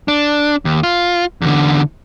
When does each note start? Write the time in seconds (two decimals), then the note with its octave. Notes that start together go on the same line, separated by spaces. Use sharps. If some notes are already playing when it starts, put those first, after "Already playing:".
0.08 D4
0.65 D#2
0.83 F4
1.41 E2 D3